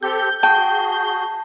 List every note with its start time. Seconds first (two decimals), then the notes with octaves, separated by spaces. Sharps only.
0.03 C4 G4 A4 G6
0.43 F#4 G#4 G5 A5